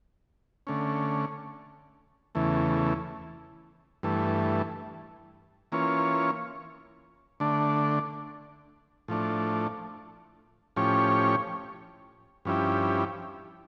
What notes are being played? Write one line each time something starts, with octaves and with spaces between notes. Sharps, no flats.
D3 A3 C#4
E2 C#3 E3 A3
G2 E3 A3
E3 A#3 C#4 F4 C#5
D3 A3 D4
A2 F3 A3 D4
A2 F3 C#4 G4 C#5
G2 F3 C#4 E4 G4